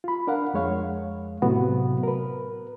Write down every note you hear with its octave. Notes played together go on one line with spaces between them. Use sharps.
F4 B5
D4 A#4 F5 F#5
F2 G#3 C#5 F5
A2 C3 F#3 B3 F#4
A#4 B4